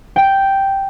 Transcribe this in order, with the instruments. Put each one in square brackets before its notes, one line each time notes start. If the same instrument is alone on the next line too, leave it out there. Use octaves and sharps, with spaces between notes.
[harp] G5